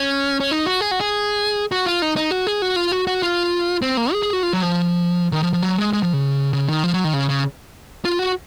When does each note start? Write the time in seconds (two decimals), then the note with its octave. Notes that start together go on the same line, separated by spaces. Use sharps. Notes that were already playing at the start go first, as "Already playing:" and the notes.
Already playing: C#4
0.40 C#4
0.51 D#4
0.66 F#4
0.81 G#4
0.91 F#4
1.01 G#4
1.72 F#4
1.86 F4
2.02 D#4
2.16 D#4
2.31 F#4
2.47 G#4
2.62 F#4
2.76 F4
2.92 F#4
3.07 F#4
3.22 F4
3.82 C4
3.97 A#3
4.13 G#4
4.23 G#4
4.33 F#4
4.43 F4
4.53 F#3
4.63 F3
5.32 D#3
5.43 F3
5.53 F3
5.63 F#3
5.78 G#3
5.93 G#3
6.03 F3
6.13 C#3
6.53 C#3
6.69 D#3
6.84 F3
6.94 F#3
7.04 D#3
7.13 C#3
7.29 C#3
8.05 F4
8.19 F#4